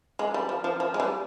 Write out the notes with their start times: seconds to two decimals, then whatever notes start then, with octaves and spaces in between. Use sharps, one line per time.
0.19 G#3
0.34 G3
0.49 F3
0.64 F3
0.80 F3
0.94 G#3
1.00 G3